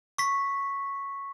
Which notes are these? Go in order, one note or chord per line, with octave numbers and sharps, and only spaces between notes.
C#6 B6